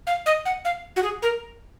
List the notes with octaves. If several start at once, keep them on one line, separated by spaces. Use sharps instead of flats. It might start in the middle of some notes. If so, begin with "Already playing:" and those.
F5
D#5
F#5
F5
F#4
G#4
A#4